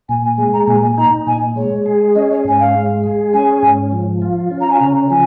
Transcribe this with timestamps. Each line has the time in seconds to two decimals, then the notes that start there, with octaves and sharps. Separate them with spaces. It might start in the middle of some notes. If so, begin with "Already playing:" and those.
0.09 A#2 G#5
0.23 G#5
0.38 G#3 G#5
0.53 A#5
0.68 A#2 G#5
0.82 G#5
0.97 D#4 A#5
1.26 A#2 G#5
1.56 G#3 C#5
1.86 G#4
2.15 C#4 D#5
2.30 C#5
2.45 G#2 G#5
2.59 F5
2.75 G#3
3.03 G#4
3.33 C#4 G#5
3.63 G#2
3.92 F3
4.22 F4
4.51 C#4
4.60 A#5
4.70 G#5
4.79 C#3 A#5
5.10 F3 G#5